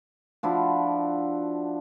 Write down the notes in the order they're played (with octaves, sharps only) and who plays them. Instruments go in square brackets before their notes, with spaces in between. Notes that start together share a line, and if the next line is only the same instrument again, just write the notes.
[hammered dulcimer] F3 D4 E4 F#4